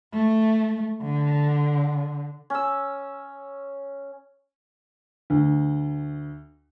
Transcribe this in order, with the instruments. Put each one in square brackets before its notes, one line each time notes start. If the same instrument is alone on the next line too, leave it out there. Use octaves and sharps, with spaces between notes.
[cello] A3
D3
[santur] C#4 E6
[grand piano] D2